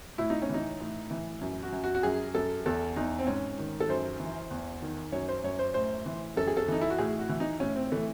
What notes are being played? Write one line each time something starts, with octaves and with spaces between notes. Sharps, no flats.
A2 E4
D#4
C#4
E3 D#4
A2
E3
F#2
F#4
F#2
F#4
F#4
F#2 G#4
F#2 A4
E2 A4
E2 D#4
C4
G#2 C#4
D#3
A4
F#2 C5
E3
E2
D#3
F#2 C#5
C5
F#2 C#5
C5
A2 C5
E3
F#2 A4
G#4
A4
E3 D#4
E4
F#4
A2 G#4
F#4
E3
D#4
A2 C#4
C4
E3 A3